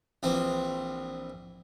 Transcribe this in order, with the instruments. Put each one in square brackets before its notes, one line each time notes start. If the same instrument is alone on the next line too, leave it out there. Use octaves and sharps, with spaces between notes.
[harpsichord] A#1 E3 C4